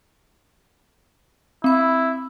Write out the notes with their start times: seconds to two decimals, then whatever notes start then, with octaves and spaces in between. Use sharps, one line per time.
1.64 C4 E4 B5